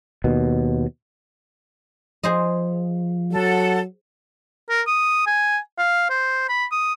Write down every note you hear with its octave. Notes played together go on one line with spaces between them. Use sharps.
D#2 B2
F3 G#4 C5 D#5
F#3 A4 F#5
A#4
D#6
G#5
F5
C5
B5
D#6